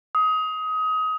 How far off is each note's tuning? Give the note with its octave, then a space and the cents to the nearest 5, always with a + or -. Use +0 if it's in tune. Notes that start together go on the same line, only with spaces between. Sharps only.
D#6 +25